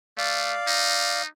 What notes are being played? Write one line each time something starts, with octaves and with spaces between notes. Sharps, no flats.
A3 D5 F5
D#4